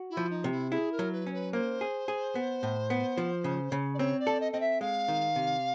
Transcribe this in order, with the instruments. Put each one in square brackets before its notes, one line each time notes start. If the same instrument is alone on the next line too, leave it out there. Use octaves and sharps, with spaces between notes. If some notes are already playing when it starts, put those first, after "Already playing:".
Already playing: [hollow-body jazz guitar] F#4
[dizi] E4
[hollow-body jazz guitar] F3
[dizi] D#4
[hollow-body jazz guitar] C3
[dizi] E4
[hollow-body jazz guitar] E4 [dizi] G#4
[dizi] A#4
[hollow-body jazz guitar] F#3
[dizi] B4
[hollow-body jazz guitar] C#4
[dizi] B4
[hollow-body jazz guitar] A#3 [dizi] C5
[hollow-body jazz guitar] G#4
G#4
B3
A2
B3
F3
C#3
C#3
[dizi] D5
[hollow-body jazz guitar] C4 [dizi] C#5
[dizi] D5
[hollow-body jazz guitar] A4
[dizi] D#5
[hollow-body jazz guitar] C4 [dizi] D#5
[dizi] E5
[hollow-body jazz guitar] G#3 [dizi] F5
[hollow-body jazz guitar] D#3
C3